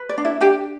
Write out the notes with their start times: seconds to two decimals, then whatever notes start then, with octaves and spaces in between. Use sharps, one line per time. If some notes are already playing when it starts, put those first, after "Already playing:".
Already playing: B4
0.09 D5
0.18 D4
0.25 E4 E5
0.41 D4 G4 G5